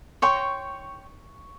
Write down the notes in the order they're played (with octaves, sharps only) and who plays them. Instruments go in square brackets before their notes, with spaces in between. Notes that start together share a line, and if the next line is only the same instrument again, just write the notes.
[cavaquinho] C#5 G5 C6 [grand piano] C#6